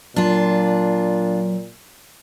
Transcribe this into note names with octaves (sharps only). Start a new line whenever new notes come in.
A#2 F#3 D4 F4